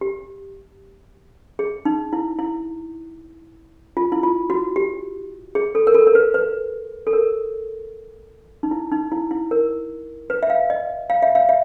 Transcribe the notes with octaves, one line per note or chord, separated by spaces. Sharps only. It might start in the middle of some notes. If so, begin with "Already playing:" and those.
G4
G#4
D#4
E4
E4
F4
E4
F4
F#4
G4
G#4
A4
A#4
A4
A#4
B4
B4
A4
A#4
D#4
E4
D#4
E4
E4
A#4
B4
E5
F5
D#5
F5
E5
F5
E5